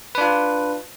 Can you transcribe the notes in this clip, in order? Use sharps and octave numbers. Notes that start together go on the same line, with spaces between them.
D4 F4 B4